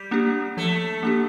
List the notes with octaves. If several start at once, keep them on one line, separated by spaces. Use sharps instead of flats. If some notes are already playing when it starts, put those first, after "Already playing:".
Already playing: G3
A#3 D4 G4
F3 A3
A#3 D4 G4